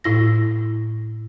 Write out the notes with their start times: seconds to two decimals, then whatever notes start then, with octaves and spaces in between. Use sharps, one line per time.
0.04 A2 E4 A#6